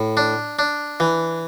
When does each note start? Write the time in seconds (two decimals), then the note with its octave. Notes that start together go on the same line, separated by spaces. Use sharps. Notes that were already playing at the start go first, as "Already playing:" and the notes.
Already playing: A2
0.17 D4
0.59 D4
1.00 E3